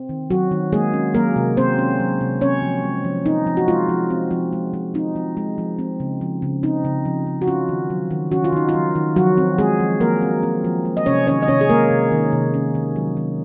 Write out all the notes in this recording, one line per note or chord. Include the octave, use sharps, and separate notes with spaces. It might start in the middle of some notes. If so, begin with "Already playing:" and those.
Already playing: C4
D#3
F#3 F#4
D#3
G#3 A#3 G#4
C#4
F#3 A#3 A#4
C3
A#3 C4 C5
C#4
F#3
C3
C4 C#4 C#5
F3
G#3
F3
C4 D#4
F3
F#4
G#3 F4
F3
C4
F3
G#3
F3
C4 D#4
F3
G#3
F3
C4
C#3
F3
C#3
C4 D#4
C#3
F3
C#3
F#4
C#4 F4
D#3
F#3
D#3
C#4 F#4
F4
D#3 D#4
F4
F#3
D#3
F3 F#3 F#4
C4
G#3 C4 G#4
F3
F3 A#3 A#4
C4
C4
F3
G#3
D#5
C3 C#4 C#5
D#3 C#4 C#5
D#5
C3 C#4 C#5
G#4
G#3 A#3 A#4
C3
D#3
C3
C#4
D#3
F#3
D#3